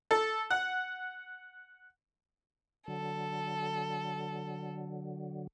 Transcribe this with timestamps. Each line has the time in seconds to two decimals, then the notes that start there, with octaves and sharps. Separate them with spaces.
0.11 A4
0.50 F#5
2.88 D3 F#3 A4